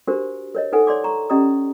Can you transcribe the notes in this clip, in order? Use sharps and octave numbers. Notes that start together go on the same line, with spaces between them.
D4 F#4 G4 A#4 C5
A#4 C#5 D#5
D#4 A4 B4 F#5 G#5
C#5 D5 C6 D6
A#5 C#6
C#4 G4 D5 D#5 A#5 D#6